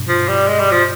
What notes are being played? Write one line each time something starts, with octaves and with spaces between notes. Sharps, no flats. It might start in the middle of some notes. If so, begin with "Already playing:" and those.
Already playing: G2 B2
F3
G3
G#3
G3
F3